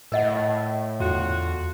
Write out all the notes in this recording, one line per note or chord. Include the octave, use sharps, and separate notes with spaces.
A2 A#4 D#5 F#5
E2 D3 F4 F#4